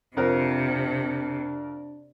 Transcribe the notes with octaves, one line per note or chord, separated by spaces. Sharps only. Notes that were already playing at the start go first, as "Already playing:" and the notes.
F2 C3 D4 A#4